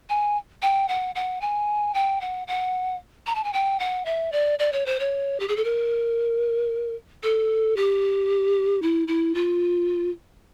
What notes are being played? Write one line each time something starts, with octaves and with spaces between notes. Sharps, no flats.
G#5
G5
F#5
F#5
G#5
G5
F#5
F#5
A#5
A5
G#5
G5
F#5
E5
D5
D5
C#5
C5
C#5
G4
G#4
A4
A#4
A4
G4
E4
E4
F4